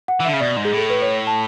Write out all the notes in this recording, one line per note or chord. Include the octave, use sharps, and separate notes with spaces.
F#5
E3
D3 E5
C#3
B2 D5
G#2
G#4
A2 A4
B4
C#5
A5